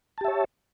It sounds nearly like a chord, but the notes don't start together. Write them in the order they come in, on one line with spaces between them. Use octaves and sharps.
A5 G4 E5 C#5